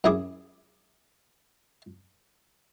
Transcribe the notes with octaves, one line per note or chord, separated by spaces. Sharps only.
F#2 E4 G#4 D6